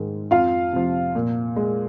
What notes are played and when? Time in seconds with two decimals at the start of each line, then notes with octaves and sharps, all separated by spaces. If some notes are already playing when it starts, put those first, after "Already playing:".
Already playing: G#2 D#3 G#3
0.31 F2 F4 F5
0.73 C3 F3
1.15 A#2
1.56 G#3